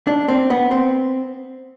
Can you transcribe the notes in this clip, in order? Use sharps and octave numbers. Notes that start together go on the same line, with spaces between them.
D4
C4
B3
C4